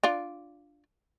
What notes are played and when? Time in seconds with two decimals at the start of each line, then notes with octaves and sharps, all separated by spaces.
0.03 D4 F4 D5